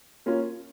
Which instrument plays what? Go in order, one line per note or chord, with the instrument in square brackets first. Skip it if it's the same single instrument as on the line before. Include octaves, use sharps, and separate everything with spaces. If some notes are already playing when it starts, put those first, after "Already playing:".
[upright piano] A#3 C#4 F4